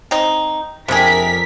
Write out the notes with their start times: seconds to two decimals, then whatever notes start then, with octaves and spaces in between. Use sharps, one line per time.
0.11 C4 D#4
0.88 F2 C3 D4 G#4 A#4 B6